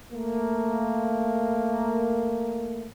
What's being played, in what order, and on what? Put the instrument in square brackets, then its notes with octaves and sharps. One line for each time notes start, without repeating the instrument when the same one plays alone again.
[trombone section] A3 A#3